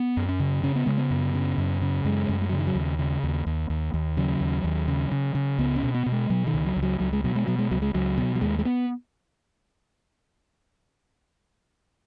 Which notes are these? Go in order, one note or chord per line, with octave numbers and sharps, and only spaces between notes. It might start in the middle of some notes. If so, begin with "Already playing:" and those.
Already playing: B3
F#2
C#4
C#3
C#3 C#4
B3
C#3 G#3
B3
F#2
C#3
F#2
C#3
F#2 G#3
F#2
G#3
C#3 F#3
D#3
F#3
D#2
C#3
D#2
D#2
D#2
D#2
C#3 F#3
D#2
D#2
C#3
C#3
C#3
C#2 B3
C#4
B2
B3
B2
G#3
B2 F#3
D#3
C#2
F#3
C#2
F#3
C#2 F#3
G#3
B2 F#3
G#3
B2 F#3
G#3
C#2 F#3
G#3
C#2 F#3
B2
F#3
D#2 G#3
G#3
B3